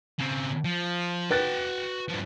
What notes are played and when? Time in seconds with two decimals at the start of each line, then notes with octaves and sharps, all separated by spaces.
0.19 C#3 C4
0.65 F3
1.30 F#4 B4 G5 F#6 A6
2.09 G2 F3